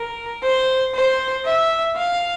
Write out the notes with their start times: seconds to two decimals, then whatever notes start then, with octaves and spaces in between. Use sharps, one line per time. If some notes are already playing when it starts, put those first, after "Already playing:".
Already playing: A#4
0.43 C5
0.95 C5
1.46 E5
1.96 F5